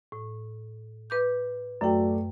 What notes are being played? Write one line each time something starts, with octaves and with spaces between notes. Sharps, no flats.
A2
B4 D6 G6
F#2 F#3 A3 D5 G5